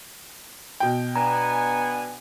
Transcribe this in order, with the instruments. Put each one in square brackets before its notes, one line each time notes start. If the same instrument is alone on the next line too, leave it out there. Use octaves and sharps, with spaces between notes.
[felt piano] B2 G5
[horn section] B3 D4 G#5 [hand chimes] A#5